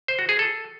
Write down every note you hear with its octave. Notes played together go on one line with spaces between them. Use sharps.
C5
F#4
G#4
A4